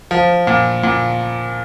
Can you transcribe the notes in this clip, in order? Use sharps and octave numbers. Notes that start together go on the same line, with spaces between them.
F3
A#2
A#2